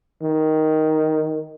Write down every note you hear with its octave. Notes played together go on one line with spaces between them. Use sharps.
D#3